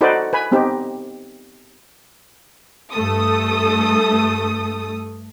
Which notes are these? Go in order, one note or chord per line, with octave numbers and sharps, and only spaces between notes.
D#4 F#4 A4 B4 C5 D5
B4 G#5 B5
B3 C4 D#4 G4
G2 A3 A4 D#6